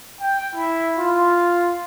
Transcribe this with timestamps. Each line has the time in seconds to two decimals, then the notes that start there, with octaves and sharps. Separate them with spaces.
0.19 G5
0.54 E4
0.97 F4